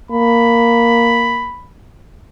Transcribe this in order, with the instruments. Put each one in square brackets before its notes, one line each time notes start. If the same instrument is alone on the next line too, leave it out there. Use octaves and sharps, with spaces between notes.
[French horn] A#3 [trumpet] B5